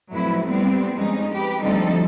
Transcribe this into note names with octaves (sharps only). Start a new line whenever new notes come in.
F2 A2 F#3 E4 B4
G3 B3 C4
F2 G#3 C#4 D#4
G4 B4
D2 F3 G3 C4 D#4 A4